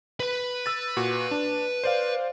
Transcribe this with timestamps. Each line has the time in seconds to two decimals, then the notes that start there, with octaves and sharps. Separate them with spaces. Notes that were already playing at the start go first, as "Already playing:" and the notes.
0.20 B4 B5
0.66 E6 A6
0.97 A#2 F#4
1.31 D4
1.84 C5 D5 F5